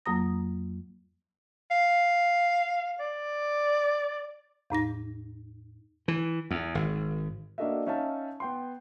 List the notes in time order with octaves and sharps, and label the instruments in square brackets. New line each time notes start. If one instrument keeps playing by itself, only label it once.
[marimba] F2 F#3 A#3 A#5 D#6 A#6
[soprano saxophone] F5
D5
[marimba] E2 A2 D#4 A#6
[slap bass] E3
E2
G#1
[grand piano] A#3 D4 F#4 A4 D#5 E5
C#4 D#4 E5 F5 A5
B3 G5 C6